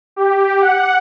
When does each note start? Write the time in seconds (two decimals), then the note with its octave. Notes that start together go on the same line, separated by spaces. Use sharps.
0.16 G4
0.61 F#5